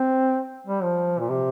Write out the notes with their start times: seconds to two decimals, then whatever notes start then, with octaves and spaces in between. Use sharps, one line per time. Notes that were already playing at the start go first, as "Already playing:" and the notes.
Already playing: C4
0.67 G3
0.83 F3
1.20 A#2
1.29 C3